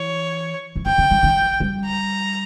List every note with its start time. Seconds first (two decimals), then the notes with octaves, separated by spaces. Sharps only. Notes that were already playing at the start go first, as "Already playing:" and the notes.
Already playing: E3 C#5
0.76 E3
0.86 D#3 G5
0.98 C#3
1.11 D#3
1.23 D#3
1.60 G3
1.85 A#5